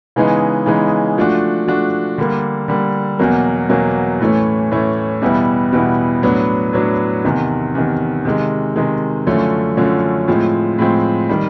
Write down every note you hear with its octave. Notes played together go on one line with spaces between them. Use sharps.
C#3 E3 G#3 B3 D#4
C#3 E3 G#3 B3 D#4
F3 A3 D4 F#4
F3 A3 D4 F#4
D3 G3 A#3
D3 G3 A#3
E2 B2 F#3 A#3
E2 B2 F#3 A#3
A2 E3 A3 C#4
A2 E3 A3 C#4
E2 B2 G3 B3 E4
E2 B2 G3 B3 E4
A2 F#3 B3 D4
A2 F#3 B3 D4
E2 C3 D#3
E2 C3 D#3
C3 D#3 G#3
C3 D#3 G#3
F#2 D3 F3 A3 C#4
F#2 D3 F3 A3 C#4
A2 F3 G#3 C4
A2 F3 G#3 C4
D#3 G3